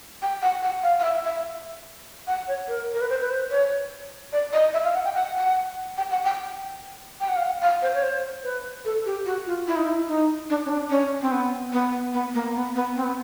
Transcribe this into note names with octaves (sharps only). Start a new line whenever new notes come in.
G5
F#5
F#5
F5
F5
E5
E5
F#5
C#5
A#4
A#4
B4
C5
B4
C5
C#5
D5
D#5
E5
F5
F#5
G5
F#5
F#5
G5
F#5
G5
G5
F#5
F5
F#5
F5
C5
C#5
C5
B4
A4
G4
F#4
F4
E4
D#4
E4
D#4
D4
C#4
D4
C#4
C4
B3
B3
B3
A#3
B3
B3
C4
B3